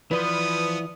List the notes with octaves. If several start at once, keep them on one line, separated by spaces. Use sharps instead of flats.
E3 F3 B3 B4 D5 C6 D#6